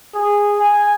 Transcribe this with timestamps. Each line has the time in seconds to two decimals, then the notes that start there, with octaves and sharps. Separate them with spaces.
0.14 G#4
0.59 G#5